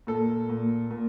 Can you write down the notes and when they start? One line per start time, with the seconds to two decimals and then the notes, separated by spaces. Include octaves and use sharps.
0.07 A#2 A4
0.49 A#2
0.90 A#2